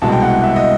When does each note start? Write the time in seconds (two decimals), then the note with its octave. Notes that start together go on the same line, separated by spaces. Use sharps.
0.02 C2 B2 G#3 A5
0.12 G5
0.22 F#5
0.44 E5
0.56 D#5